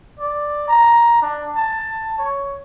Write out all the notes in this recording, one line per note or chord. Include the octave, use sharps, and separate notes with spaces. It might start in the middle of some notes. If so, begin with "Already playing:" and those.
D5
A#5
D4
A5
C#5